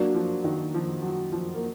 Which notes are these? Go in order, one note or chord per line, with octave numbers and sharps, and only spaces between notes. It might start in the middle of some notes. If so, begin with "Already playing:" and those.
Already playing: F#3 A#3 D4 F#4 A#4 D5
F3
D#3
F3
F#3
F3
A#3